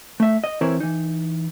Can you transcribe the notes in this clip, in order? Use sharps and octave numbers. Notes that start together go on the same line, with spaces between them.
A3 E5
D#5
E3 C4 E4 A#4 C5 C#5
E3 D#4